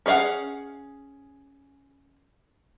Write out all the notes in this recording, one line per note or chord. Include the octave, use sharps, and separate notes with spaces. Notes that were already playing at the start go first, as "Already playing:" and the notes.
C#4 G#4 D5 F5 F#5